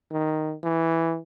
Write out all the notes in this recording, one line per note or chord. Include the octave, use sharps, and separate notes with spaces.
D#3
E3